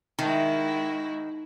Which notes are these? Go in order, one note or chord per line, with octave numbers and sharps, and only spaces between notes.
D#3 G#3 D#4 E4 F#4 E5